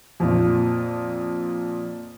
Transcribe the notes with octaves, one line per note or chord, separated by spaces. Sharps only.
F2 A#2